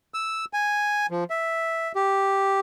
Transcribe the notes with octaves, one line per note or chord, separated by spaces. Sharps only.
E6
G#5
F3
E5
G4